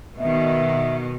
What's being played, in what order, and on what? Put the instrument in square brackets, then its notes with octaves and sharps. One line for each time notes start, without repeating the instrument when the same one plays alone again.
[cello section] B2 D#3 [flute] E5